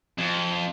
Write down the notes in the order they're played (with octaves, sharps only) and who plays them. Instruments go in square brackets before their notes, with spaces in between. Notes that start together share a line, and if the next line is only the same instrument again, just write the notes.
[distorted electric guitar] F2